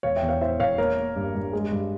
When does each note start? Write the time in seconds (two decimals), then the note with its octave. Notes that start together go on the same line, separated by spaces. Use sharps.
0.03 E1 C#5 F5
0.16 E5 G5
0.22 E2
0.29 C#5 F5
0.41 E3 C5 E5
0.60 E1 C#5 F5
0.78 A#3 A#4 C#5
0.97 A#3
1.16 G2
1.35 G2
1.53 G#3
1.72 G2